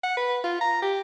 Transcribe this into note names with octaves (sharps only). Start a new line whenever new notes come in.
F#5
B4
F4
A#5
G4